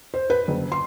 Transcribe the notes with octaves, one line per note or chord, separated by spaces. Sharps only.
C5
B4
F#1
C6